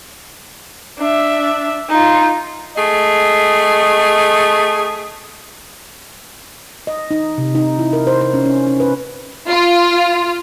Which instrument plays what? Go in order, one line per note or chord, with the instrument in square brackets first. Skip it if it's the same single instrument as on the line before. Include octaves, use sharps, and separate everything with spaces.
[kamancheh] D4 E5
D#4 F4
[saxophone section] A3 G#4 D#5
[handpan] D#5
D#4
C3
D#4
E4
A#4
C5
C5
C#4
C#4
C#4
B4
[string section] F4